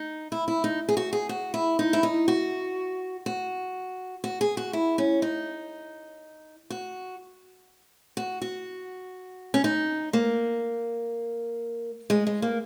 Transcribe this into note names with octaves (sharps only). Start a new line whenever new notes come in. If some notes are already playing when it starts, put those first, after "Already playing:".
Already playing: D#4
E4
E4
D#4
G#4
F#4
G#4
F#4
E4
D#4
E4
D#4
F#4
F#4
F#4
G#4
F#4
E4
C#4
D#4
F#4
F#4
F#4
C#4
D#4
A#3
G#3
G#3
A#3